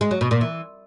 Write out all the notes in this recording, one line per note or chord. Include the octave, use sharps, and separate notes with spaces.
G#3
F#3
B2
A#2
E3